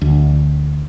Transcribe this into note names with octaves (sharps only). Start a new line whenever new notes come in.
D2